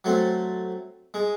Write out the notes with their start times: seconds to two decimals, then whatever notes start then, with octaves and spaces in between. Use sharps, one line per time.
0.04 F#3 A3 C4
1.14 G#3